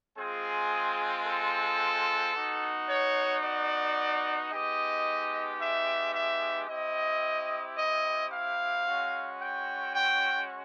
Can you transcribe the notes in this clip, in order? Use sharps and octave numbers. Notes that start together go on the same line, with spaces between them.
G#3 C4 F4 G#4
A4
B3 D#4 F#4
C#5
D5
G#3 B3 D#4 G4 D#5
E5
E5
C4 E4 G4 D#5
D#5
F5
G#3 C#4 F#4
G5
G5